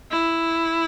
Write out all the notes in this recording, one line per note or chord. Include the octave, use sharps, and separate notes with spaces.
E4